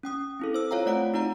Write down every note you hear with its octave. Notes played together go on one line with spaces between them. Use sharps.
C#4 G5 D#6
C4 E4 A4
C5 E6
F4 C#5 F5 G5 A#5
A3 C4 D5 F#5 D7
D#4 F4 D5 A#5